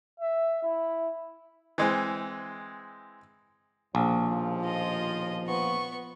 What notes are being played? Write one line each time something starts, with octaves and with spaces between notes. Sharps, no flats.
E5
E4
E3 G#3 C4
A#1 D#2 B2 F3
F4 D#5
B3 C#6